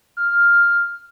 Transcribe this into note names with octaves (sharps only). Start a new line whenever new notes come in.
F6